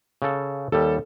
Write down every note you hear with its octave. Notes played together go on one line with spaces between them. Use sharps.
C#3 A4
D#2 G3 A4